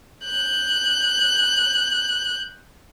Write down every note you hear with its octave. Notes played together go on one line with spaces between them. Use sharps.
F#6 G6